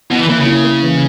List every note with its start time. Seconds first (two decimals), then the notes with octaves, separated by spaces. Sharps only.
0.10 B2 E4
0.18 E3
0.28 E3 A#3
0.37 C#3
0.46 E4
0.64 A#3
0.82 E3